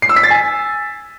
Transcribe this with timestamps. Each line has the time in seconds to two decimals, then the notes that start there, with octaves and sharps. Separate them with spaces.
0.02 C7
0.09 E6
0.16 B6
0.23 A6
0.30 G#5